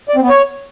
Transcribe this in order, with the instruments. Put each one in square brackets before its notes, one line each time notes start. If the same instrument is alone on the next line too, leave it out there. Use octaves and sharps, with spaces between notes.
[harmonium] D5
C4
B3
C#5